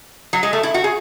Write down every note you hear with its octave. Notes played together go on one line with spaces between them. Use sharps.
F#3
G#3
A3
E4
F#4
G#4